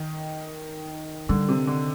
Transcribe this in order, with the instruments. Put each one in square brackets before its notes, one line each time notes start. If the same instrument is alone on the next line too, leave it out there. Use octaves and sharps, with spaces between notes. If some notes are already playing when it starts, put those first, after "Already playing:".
Already playing: [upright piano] D#3
[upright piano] D3 [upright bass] G3
[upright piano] C3
D3